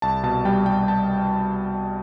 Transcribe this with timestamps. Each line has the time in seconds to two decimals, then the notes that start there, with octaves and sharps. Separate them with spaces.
0.02 C2 A5
0.23 B2 A5
0.45 G3 G5
0.66 G3 G5
0.88 A5